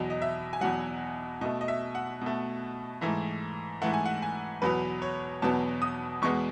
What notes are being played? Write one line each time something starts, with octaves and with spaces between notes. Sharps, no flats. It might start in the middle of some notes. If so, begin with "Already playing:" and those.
Already playing: E2 B2 F#3 D#5
D#5
E5
G#5
E2 B2 F#3 F#5
B2 A3 D#5
D#5
E5
F#5
B2 A3
G#2 E3 A3
G#2 E3 A3 F#5
G#5
F#5
G#5
E2 B2 F#3 B3 B4
C#5
E2 B2 F#3 B3 A5
D#6
E2 B2 G#3 B3 C#6